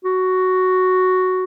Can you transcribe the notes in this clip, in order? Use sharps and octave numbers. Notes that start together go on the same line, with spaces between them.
F#4